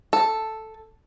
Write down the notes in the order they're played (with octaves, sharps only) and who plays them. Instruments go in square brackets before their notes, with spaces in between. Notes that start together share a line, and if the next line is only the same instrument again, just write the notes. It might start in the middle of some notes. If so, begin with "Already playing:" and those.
[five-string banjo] A4